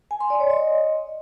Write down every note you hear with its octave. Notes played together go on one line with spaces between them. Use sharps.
G#5
C6
D5
C#5
D#5